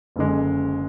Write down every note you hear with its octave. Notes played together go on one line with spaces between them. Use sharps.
F#1 F#2 D3 G#3